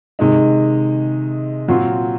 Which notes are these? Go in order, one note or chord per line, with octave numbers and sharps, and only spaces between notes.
C3 D#3 G#3 D#4
A#2 F#3 C4 F4